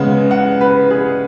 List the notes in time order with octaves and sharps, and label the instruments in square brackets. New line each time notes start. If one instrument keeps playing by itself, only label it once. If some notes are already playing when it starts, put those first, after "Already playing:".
Already playing: [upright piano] C#3 G#3 B3 F#5
F#5
B4
G#4